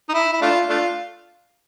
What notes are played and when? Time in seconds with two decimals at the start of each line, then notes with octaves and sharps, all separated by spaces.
0.09 D#4
0.14 E4
0.32 E4
0.41 A3 D4 F4
0.69 A3 D4 F4